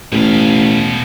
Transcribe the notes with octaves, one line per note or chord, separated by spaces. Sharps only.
A1 B2 F5